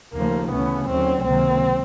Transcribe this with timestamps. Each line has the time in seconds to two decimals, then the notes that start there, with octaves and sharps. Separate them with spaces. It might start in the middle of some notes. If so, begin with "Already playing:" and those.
0.13 D#2 C#3 F3 A3 A#3
0.50 D2 C#3 E3 A3 B3 C#4
0.88 D#2 D3 F#3 A3 C4 C#4
1.24 C#2 C3 D#3 F#3 A#3 C4